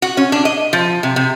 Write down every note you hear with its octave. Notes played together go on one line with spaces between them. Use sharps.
F#4
C#4
D4
D#5
F3
C3
C3